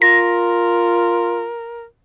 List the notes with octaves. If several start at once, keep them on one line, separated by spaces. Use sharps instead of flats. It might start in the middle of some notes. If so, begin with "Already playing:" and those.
F4 A#4 A#6